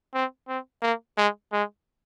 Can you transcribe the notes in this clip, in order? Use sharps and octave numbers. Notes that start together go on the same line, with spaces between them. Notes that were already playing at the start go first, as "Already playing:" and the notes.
C4
C4
A#3
G#3
G#3